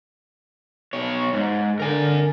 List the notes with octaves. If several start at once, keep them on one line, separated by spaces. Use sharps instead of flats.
B2 C#5
G#2
D3 A#4 G#5